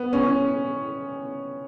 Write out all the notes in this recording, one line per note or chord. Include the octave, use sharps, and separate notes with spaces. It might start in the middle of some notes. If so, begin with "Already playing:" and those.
Already playing: B3
C#4